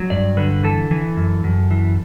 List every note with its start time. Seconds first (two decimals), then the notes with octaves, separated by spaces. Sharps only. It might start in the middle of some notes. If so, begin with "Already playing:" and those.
Already playing: F#3
0.10 G2 D5
0.37 D3 B4
0.63 E3 A4
0.91 E3
1.17 F#2
1.44 F#2
1.71 E3